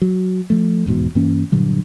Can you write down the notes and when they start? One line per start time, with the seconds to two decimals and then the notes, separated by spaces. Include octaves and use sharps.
0.02 F#3
0.50 F3 A3
0.86 D#1 E2 G#2 B2
1.15 G2 E3 A#3 C#4
1.52 G2 A#2 D3 F#3